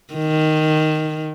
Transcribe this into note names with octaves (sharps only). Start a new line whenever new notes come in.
D#3